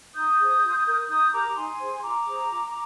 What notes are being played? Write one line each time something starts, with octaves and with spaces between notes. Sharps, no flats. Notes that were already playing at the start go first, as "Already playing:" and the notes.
D#4 D#6 G6
G#4 C5
F4
A#4
D#4 D#6 G6
G4 A#4 A#5 D6
D#4 G#5 C6
G#4 C5
C6
F4 A#5 D6
G#4 C5
F4